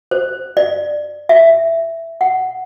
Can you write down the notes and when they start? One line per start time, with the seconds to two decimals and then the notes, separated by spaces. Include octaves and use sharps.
0.11 C5
0.57 D5
1.29 E5
2.21 F#5